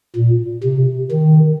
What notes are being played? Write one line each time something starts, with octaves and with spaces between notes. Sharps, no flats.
A#2
C3
D#3